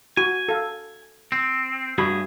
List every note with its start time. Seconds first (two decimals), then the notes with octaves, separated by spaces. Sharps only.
0.17 F#4 G#5
0.49 A4 F5
1.32 C4
1.98 G2 A3 F#4 G#4 B5